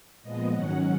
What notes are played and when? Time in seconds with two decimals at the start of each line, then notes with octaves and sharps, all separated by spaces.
0.23 A#2 F3 G#3 B3 D#5
0.52 G#2 D#3 F#3 C#4 F#5